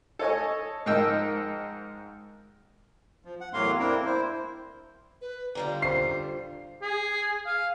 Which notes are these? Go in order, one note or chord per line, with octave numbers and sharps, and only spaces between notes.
A4 C#5 D#5 G#5
G#2 F3 A#4 D#5 G5 E6
F3
F#5
E2 A2 F#3 A#3 F5 C6
A#3 C4 D4 E4 A#4
E4 C5
B4
D3 G3 F4 A#5
C5 C7
G#4
F5